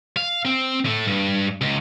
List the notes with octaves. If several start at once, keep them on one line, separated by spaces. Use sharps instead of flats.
F5
C4
A2 A3
G2
C#2